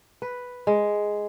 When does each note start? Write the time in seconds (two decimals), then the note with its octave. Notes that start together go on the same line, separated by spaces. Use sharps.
0.22 B4
0.67 G#3